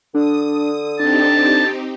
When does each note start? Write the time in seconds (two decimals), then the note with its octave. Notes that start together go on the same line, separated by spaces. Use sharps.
0.15 D3 D4 D#6
1.00 C4 D4 D#4 G4 A5